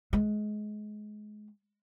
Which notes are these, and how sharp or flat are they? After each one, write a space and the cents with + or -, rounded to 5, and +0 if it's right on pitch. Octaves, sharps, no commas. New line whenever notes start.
G#3 +25